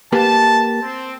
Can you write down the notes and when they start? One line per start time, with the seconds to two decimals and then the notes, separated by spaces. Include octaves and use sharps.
0.12 A#3 G4 B4 A5
0.82 C4